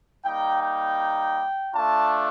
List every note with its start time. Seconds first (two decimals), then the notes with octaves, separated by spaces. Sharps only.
0.25 G3 A#3 D#4 G5
0.62 G5
1.75 A3 D4 F4 A5